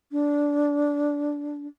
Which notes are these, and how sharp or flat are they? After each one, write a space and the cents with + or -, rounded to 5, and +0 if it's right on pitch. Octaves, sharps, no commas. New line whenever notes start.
D4 -15